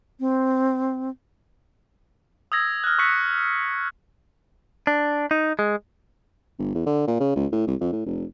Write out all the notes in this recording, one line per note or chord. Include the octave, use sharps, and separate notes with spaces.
C4
D#6 E6 G#6 A#6
F6 F#6
C#6 E6 F#6 B6 C#7
D4
D#4
G#3
G1
E2
D3
A#2
C#3
C#2
A2
C2
F2
A2
F1